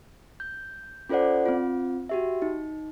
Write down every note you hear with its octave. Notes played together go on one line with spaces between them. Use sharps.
G6
C#4 F4 A4 C5 D5 F#5
C4 F4
F#4 G4 E5
D#4